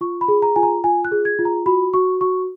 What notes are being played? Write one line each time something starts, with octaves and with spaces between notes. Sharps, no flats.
F4 C#6
B5
G#4
A#5
F4 G#5
A#5
F4 G#5
F#6
G#4
G#6
F4
A#5
F#4 B5
F#4 C#6
F#4 C#6